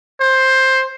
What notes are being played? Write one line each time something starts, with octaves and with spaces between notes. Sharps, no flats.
C5